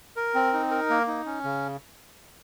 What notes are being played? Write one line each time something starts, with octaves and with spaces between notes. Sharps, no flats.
A#4
C4
D#4
A#4
A#3
D#4
C#4
C#3